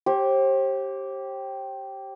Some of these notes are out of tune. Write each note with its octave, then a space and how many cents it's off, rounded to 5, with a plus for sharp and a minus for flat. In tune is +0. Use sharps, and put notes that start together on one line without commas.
G4 -10 C5 +40